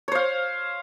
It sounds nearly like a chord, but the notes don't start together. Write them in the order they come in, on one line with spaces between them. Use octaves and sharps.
C#5 C5 F5